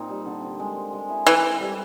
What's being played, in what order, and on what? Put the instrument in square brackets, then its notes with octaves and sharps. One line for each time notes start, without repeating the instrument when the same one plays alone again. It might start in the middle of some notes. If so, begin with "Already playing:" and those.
Already playing: [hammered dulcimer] A#2 C4 D#4
G3
D3
C4
G#3
C4
G#3
E4
[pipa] E3 [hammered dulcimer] A4
[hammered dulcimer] C4
G3